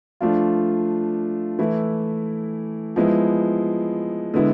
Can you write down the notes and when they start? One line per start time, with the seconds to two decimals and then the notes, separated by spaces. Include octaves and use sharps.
0.20 F3 A3 D4 F4
1.59 E3 A3 E4
2.96 F3 G#3 B3 E4
4.34 D3 G#3 B3 E4